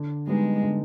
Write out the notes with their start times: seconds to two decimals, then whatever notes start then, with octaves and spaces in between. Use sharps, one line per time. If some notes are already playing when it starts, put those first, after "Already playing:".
Already playing: D3
0.27 G3 G#3 B3 D#4
0.63 D3